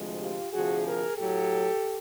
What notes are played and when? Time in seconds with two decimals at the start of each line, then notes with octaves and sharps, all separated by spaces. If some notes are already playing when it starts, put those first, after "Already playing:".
Already playing: D2 C3 F3 G#3
0.21 F4 G4
0.53 D2 C3 F3 F#4 G#4
0.86 G#4 A#4
1.17 A2 F#3 G4 A4